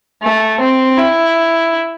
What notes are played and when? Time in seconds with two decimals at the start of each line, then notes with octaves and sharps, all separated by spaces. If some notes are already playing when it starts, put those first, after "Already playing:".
0.22 A3
0.60 C4
0.98 E4